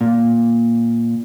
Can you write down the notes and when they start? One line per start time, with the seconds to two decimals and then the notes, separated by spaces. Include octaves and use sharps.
0.01 A#2